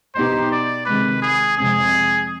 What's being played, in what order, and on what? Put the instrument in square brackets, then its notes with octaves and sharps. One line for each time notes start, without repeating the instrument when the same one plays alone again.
[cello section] B2 B3 D#4 G4 [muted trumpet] C5
[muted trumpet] D5
[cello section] C3 D#3 G#3 [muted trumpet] B4
[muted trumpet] G#4
[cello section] F2 C3 F3 G#3 C4 [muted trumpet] G#4